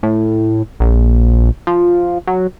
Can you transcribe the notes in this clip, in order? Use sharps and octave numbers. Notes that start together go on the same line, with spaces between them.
A2
A#1
F3
F#3